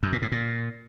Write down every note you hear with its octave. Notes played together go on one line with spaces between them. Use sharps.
F#2
A#2
A2
A#2